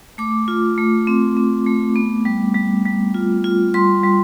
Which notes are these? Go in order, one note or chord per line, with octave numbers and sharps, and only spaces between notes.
A3 D6
F4
A3
C4
C4
A3
B3
G3
G3
G3
F4
F4
G3 C6
G3